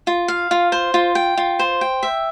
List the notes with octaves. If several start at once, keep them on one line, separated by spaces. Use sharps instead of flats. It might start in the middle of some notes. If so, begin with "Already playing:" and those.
F4
F5
F4
C5
F4
G5
F4
C5
G5
E5